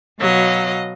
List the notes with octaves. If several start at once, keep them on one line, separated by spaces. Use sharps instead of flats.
B2 F#3 D#5 F5